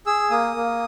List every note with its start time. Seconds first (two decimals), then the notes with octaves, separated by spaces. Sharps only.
0.06 G#4 E6
0.30 A#3 D#6
0.56 A#3